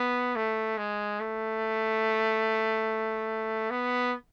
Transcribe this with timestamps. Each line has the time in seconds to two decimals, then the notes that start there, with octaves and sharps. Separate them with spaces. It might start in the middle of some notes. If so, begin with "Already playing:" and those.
Already playing: B3
0.36 A3
0.78 G#3
1.20 A3
3.70 B3